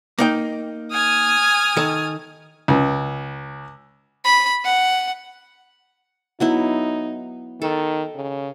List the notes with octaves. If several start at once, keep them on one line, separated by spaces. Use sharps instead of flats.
A#3 D#4 G5
G#5 D#6 F6
D#3 A4
C#2
B5
F#5
F#3 B3 D#4 E4
D#3 A4
C#3